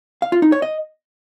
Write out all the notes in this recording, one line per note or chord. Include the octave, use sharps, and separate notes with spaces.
F5
F4
D#4
C#5
D#5